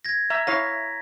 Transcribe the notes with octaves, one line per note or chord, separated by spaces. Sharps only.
G#6 A#6
E5 A#5
E4 C#5 F5 A#6 B6